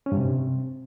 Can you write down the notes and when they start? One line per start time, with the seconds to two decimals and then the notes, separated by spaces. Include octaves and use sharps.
0.06 C#4
0.12 G2
0.17 C3